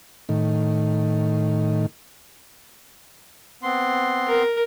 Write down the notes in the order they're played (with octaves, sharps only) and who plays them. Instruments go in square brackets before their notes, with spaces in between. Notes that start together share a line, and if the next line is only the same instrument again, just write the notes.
[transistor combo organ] A2 D#3
[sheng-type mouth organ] B3 C4 C6
[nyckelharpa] A#4